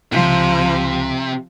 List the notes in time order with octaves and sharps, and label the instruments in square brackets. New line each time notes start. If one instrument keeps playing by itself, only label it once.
[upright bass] C#2 [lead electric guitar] C3 [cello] F3